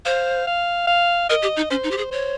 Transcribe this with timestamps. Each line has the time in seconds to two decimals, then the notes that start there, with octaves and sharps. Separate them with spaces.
0.05 C5 F5
0.47 F5
0.87 F5
1.29 A#4 D#5
1.42 G4
1.56 D#4
1.70 C#4 C5
1.84 D#4
1.91 G4
1.98 G#4
2.11 C5 C#5